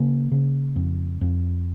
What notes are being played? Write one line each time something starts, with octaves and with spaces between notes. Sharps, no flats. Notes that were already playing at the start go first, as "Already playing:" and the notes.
Already playing: C#3 A#3
C#3
F2
F2